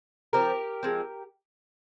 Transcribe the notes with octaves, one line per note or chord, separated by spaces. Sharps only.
F3 C4 G4 A#4
F3 G#3 C4